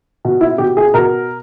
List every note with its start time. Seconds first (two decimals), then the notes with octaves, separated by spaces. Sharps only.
0.25 B2
0.41 E4
0.58 B2 G4
0.77 G#4
0.94 B2 A#4